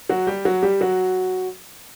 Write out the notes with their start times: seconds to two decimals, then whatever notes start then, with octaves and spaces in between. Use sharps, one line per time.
0.09 F#3 F#4
0.27 G3 G4
0.45 F#3 F#4
0.63 G3 G4
0.81 F#3 F#4